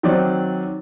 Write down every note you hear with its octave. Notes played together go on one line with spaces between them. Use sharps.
D#3 F#3 C4 D5